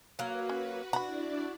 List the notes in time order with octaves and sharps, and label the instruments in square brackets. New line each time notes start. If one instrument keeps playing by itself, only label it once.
[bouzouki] F#3 A#3 [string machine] F#4 B4
[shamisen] C#4
[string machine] D4 E4 D5 [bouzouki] F#4 [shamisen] A#5 B5